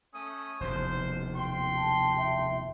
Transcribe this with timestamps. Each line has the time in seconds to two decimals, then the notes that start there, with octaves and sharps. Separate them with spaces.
0.13 A3 C#4 D#6
0.60 F1 D#2 B2 C5
1.35 G5 C6
1.76 A5
2.18 E5